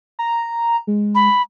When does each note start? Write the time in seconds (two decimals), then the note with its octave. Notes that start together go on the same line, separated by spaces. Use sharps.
0.19 A#5
0.87 G#3
1.15 B5